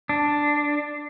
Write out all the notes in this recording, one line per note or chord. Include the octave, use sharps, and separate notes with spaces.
D4